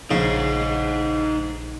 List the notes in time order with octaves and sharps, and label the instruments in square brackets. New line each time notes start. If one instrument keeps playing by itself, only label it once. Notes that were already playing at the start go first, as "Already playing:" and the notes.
[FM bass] A#1 [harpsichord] C#3 [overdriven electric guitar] D#4 C5